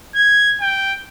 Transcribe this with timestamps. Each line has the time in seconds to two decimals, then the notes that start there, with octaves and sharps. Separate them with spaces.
0.15 G#6
0.61 G5